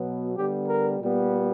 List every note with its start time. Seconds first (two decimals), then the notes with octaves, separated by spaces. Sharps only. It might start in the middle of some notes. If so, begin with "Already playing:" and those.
Already playing: B2 F#3 B3
0.36 D3 G3 B3 G4
0.68 A#4
1.00 A#2 G3 B3